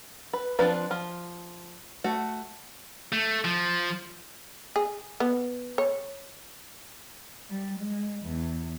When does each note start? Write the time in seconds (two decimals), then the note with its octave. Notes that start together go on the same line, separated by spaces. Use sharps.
0.33 B4
0.59 F3 C4 D4 B4
0.91 F3
2.04 A3 F#4
3.12 A3
3.45 F3
4.76 G#4
5.20 B3
5.78 C#5
7.50 G3
7.79 G#3
8.23 E2